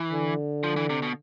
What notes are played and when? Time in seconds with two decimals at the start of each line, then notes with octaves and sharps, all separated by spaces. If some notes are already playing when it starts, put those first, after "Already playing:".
Already playing: E3
0.12 D3
0.64 F3
0.76 E3
0.90 C3
1.02 B2